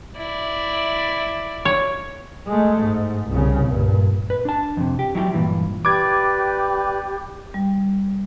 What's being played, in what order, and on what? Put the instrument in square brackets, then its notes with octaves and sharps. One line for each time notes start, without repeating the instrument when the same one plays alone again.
[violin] E4 D5
[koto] C#5
[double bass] G#3 A3
G#2
C2 C#3
G2 A#2
[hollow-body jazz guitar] B4
D4 A5
F2 C3
G4
F#3 E4 F#4 G4
G2 A#2 E3
[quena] G4 [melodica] B4 D5 [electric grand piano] D6 G#6
[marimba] G3